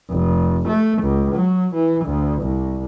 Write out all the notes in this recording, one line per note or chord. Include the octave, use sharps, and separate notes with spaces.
F1
A3
C#2
F#3
E3
D2
C2